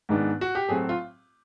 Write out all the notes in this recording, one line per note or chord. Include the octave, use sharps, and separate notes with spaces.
G#2 D#3 G#3 B3 D4
F#4
G4
A2 F#3 A3 C4 G#4
F4